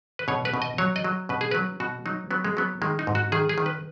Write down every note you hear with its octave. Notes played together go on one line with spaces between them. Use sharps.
B4
B2 C#5
B4
B2
D#5
F#3 C#5
D#5
F#3
B2 B4
G#4
F#3 B4
B2 F#4
F#3 D#4
F#3 B3
G#3
F#3 B3
D#3 G#3
D#4
G#2
F#4
D#3 G#4
G#4
D#3
B4